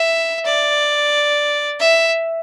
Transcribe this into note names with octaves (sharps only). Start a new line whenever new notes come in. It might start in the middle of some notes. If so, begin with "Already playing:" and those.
Already playing: E5
D5
E5